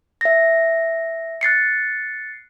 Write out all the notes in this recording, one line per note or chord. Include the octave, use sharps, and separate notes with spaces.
E5 A#6
F#6 A6 C7 C#7